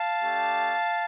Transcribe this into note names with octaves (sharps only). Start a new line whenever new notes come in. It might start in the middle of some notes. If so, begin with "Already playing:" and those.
Already playing: F5 A5
A3 D4 G4